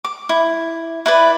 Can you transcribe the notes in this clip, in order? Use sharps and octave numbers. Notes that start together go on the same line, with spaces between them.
D6
E4
E4 B4 D5